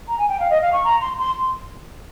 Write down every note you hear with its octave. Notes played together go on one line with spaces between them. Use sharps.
A#5
G#5
G5
F5
D#5
F5
C#6
A#5
C6
C6